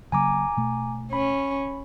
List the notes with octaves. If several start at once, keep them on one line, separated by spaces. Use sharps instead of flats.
C#3 F#3 A#3 G#5 A#5 D6
B2 A3
C#4 B5